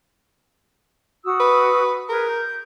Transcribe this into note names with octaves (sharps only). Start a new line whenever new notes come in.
F#4 D#6 E6
B4
G#4 A#4 B4 F6
G6